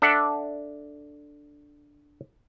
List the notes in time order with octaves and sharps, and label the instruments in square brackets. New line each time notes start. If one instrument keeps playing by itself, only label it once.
[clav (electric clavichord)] D4 A4 D5 E5 F#5